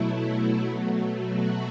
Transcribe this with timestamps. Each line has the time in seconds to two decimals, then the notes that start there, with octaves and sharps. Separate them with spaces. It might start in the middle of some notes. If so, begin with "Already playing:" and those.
Already playing: B2 F#3 A3 E4
1.22 F#4